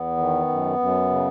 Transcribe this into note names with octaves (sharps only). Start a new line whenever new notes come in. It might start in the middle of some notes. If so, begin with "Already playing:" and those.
Already playing: E2 B3
D#3
F#2
F#2
C#3